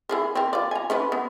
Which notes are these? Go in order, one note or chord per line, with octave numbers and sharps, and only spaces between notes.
E4 G#4 A#4
C4 A#4
F4 D5
G#5 A#5
C#4 E4 B4
B3